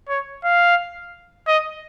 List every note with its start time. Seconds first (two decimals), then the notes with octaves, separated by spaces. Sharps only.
0.09 C#5
0.44 F5
1.48 D#5